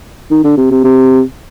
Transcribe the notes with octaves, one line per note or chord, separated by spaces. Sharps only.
D#3
D3
C3
C3
C3